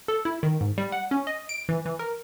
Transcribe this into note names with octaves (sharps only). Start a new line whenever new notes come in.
A4
E4
D#3
G#2
G3
F#5
C#4
D#5
D7
E3
E3
A#4